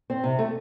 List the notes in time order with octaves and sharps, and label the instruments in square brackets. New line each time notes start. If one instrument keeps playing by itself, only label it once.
[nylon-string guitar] C4
C3
A3